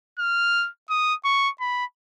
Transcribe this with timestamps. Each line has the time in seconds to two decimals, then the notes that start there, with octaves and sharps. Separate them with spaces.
0.19 F6
0.90 D#6
1.25 C#6
1.60 B5